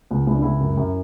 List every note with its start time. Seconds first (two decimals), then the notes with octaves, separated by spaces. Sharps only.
0.11 C#2
0.27 C#2 E4
0.35 D4
0.42 C#2 E4
0.60 F#2
0.77 F#2